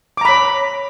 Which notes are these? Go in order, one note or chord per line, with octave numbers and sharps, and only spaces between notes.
C#5 A#5 B5 D6